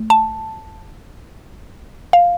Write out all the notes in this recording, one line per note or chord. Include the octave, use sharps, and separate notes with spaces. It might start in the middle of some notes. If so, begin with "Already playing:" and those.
Already playing: A3
A5
F5